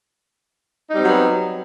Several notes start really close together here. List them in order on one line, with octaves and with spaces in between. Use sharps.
D#4 G3 C4 F#3 B3